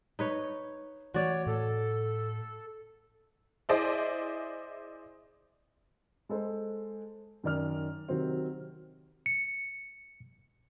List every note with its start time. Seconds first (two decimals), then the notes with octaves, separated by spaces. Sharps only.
0.19 D#4 B4 C#5
1.14 E3 A3 F#4 C#5 D5
1.47 A2 A4
3.69 E4 G#4 C5 D5 D#5
6.29 G#3 A4 C5
7.44 F#2 D#3 D5 F6
8.09 C3 D#3 F#3 C4
9.26 C#7